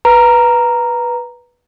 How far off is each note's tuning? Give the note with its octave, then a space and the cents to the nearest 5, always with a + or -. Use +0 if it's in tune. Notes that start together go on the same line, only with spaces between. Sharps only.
B4 -10 A#5 +0